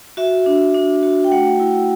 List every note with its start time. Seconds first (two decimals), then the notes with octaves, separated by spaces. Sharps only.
0.17 F#4 E5
0.46 D4
0.75 D4
1.03 F#4
1.24 G5
1.32 A3 F#5
1.60 E4